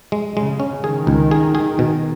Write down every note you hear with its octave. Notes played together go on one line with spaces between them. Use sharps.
G#3
C#3 G#3
C#4
D#3 G#4
C#2
G#4
G#4
B2